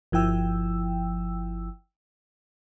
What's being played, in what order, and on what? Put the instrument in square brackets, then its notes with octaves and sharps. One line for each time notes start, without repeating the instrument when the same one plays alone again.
[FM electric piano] G1 F3 E4 G5 E6